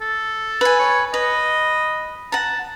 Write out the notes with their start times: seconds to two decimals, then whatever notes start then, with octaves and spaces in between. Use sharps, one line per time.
0.01 A4
0.61 B4 G#5
0.79 C#5
1.14 B4 D#5
2.32 F#5 A5 A#5